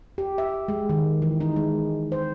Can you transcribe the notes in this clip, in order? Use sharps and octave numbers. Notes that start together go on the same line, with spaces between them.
G4
E5
G#3
D#3
E3
D#4
G#3
C5